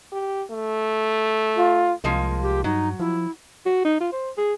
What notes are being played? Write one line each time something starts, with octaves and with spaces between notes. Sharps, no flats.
G4
A3
F4
C2 F3 G#3 A#3
G4
G2 F#3 D#4
F3 E4
F#4
D#4
F4
C5
G#4